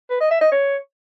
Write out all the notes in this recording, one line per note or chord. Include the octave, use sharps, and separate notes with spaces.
B4
D#5
E5
D#5
C#5